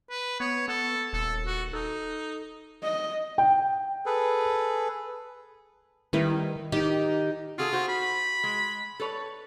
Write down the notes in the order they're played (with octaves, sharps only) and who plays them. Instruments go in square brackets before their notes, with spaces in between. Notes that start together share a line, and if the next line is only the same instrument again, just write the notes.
[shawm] B4
[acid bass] B3 [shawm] C#5
[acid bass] B3 [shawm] A4
[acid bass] D#1 [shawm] A4
[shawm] F#4
[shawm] D#4 [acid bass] A4
[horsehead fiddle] D#5
[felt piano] G5
[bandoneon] G#4 A4 B4
[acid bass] D#3 [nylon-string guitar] G3 E4 B4
[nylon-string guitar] D#3 [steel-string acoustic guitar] D#4 [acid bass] G4
[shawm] F4 [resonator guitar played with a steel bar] F#4 G#4 A4
[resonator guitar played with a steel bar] F#4 C5
[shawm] B5
[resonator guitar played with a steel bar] G#3
A4 B4 C#5